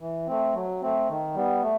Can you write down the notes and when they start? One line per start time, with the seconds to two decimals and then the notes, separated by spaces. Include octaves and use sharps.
0.01 E3
0.27 A3 C4
0.55 F#3
0.82 A3 C4
1.09 D#3
1.35 G3 B3
1.63 A3